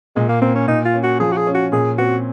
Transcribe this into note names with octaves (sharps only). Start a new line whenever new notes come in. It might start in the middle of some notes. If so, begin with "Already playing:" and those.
A#2 G#3
A#3
A#3 C4
C#4
A#2 D#4
F4
C#4
F#4
F3 G#4
F#4
G#4
C#4
F#4
A#2 G#4
C4 F#4